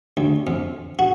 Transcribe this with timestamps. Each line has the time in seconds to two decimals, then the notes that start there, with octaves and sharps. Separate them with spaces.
0.17 D2
0.47 F2
0.99 F#4